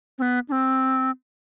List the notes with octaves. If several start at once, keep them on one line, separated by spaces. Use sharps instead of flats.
C4
B3
D4
C4